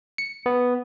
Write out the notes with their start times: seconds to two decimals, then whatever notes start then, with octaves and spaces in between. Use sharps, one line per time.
0.18 C#7
0.46 B3